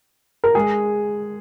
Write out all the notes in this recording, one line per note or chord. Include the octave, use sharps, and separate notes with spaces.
A#4
G#3 G#4